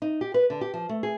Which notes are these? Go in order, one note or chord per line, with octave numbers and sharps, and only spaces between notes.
D#4
G4
B4
D3
G4
F3
A3
G#4